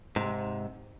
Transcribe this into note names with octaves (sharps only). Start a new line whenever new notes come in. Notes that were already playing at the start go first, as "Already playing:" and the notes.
G#2 C3